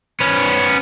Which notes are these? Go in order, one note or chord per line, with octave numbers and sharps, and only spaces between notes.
B3 C#4